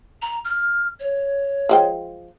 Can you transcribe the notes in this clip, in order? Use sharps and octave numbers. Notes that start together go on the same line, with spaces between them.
A#5
F6
C#5
F3 G#3 G5